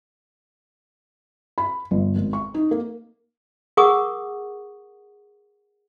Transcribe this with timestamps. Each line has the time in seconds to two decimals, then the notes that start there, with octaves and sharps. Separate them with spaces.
1.58 B5
1.91 G1
2.16 G#1
2.33 C#6
2.54 D#4
2.71 A#3
3.77 G#4 A#4 F#5 C#6 D#6